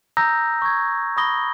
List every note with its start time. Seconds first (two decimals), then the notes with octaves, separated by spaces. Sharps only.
0.17 A#5 D#6 E6 G6 A#6
0.62 C#6 G#6
1.17 B5 C#6 D#6 A#6 G7